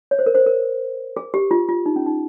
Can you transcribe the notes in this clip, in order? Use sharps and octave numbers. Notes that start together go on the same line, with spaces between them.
C#5
C5
A#4
C5
A#4
G#4
G4
F4
F4
D#4
C#4
D#4